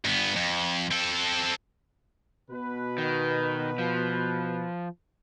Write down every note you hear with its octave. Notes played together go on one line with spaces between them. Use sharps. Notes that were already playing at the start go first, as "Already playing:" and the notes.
G2 B3
F2
C4 A4
B2 B4
D#3
F3